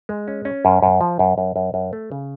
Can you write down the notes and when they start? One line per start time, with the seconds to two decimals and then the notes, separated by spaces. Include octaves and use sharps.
0.09 G#3
0.28 C#4
0.45 C#4
0.65 F#2
0.82 F#2
1.01 F3
1.19 F#2
1.38 F#2
1.56 F#2
1.74 F#2
1.93 A3
2.12 C#3